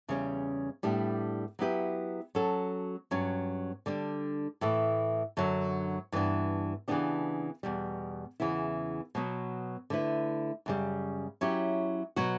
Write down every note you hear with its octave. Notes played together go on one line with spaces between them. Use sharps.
E2 C#3 G3 C#4
A2 G3 B3 D4 G4
F#3 B3 E4 G4 B4
F#3 C#4 F#4 A4
G2 F#3 C#4
D3 G3 D4
A2 E3 A3
F#2 D3 F#3
G2 E3 B3 D4
C#3 E3 B3 D4 G4
E2 B2 G3
E2 C#3 E3 B3 E4
B2 F#3 B3
D3 A3 E4 B4
F#2 C#3 G3
F#3 C#4 E4 G4
B2 F#3 B3 F#4